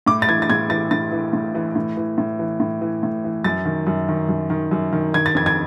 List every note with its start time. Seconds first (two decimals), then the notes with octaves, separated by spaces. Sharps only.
0.06 A2 D6
0.22 A6
0.28 E3 G#6
0.42 A6
0.50 A2 G#6
0.70 E3 A6
0.91 A2 A6
1.12 E3
1.33 A2
1.55 E3
1.75 A2
1.97 E3
2.18 A2
2.39 E3
2.60 A2
2.81 E3
3.03 A2
3.24 E3
3.44 F#2 A6
3.65 D#3
3.87 F#2
4.08 D#3
4.29 F#2
4.50 D#3
4.71 F#2
4.93 D#3
5.14 D#3 G#6
5.26 A6
5.35 F2 G#6
5.46 G#6